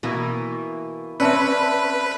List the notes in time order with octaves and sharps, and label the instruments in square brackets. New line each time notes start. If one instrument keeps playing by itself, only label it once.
[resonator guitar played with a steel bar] B2 E3 A#3
[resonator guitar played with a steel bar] C4 C#4 [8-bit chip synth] B4 [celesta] D5 [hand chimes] E5 A5 E6